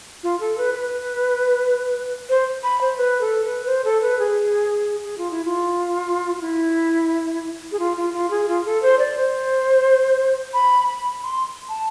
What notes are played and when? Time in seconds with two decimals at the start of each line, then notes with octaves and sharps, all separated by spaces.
0.23 F4
0.40 A4
0.58 B4
0.74 B4
2.29 C5
2.63 B5
2.81 C5
2.98 B4
3.21 A4
3.44 B4
3.66 C5
3.85 A4
4.02 B4
4.19 G#4
5.05 G#4
5.18 F4
5.31 E4
5.45 F4
6.37 F4
6.41 E4
7.72 G#4
7.79 F4
7.97 F4
8.14 F4
8.30 G#4
8.48 F4
8.65 A4
8.82 C5
8.99 D5
9.16 C5
10.54 B5
10.89 B5
11.23 C6
11.69 A5